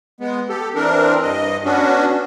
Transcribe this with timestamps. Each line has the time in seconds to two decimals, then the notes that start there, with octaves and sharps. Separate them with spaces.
0.21 G#3 B3
0.49 G4 A4
0.75 E3 C4 D4 A#4
1.22 G2 D#5
1.65 B3 C#4 D4 F#4